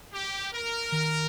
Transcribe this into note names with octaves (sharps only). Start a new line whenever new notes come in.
G4
A#4
D#3